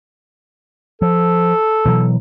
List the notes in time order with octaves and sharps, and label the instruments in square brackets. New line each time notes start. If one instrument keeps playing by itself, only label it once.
[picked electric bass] F3 [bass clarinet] A4
[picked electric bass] B2 E3 F#3